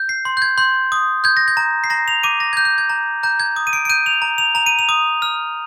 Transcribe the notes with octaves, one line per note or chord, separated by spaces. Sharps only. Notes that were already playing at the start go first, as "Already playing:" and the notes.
Already playing: G6
C7
C6
G6
G#6
C6 G6
D#6
G6 G#6
A#6
G#6
A#5
C7
A#5 A#6
F7
D6 D#7
A#6
G6 G#6
G6
G#6
A#5
A#5 G6
G#6
D#6
D#7
D7
D7
G6 D#7
F7
A#5
F7
A#5 F7
D#7
F7
D#6
F6